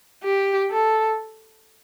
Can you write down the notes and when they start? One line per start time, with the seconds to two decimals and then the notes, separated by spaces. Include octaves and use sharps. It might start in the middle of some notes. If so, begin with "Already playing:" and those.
0.24 G4
0.71 A4